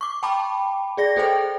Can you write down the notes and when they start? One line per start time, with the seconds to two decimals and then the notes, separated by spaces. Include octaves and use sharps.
0.01 C#6 D6
0.23 G5 A5 B5 D6
0.97 G#4 D5 A#6
1.16 G#4 A4 C5 D#5 G5